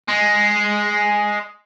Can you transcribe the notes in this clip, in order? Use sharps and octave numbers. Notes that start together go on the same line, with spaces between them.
G#3